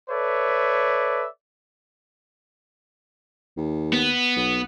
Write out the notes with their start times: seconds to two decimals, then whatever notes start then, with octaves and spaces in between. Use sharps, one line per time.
0.10 A4 B4 C#5 D5 E5
3.57 D#2
3.93 B3
4.36 B1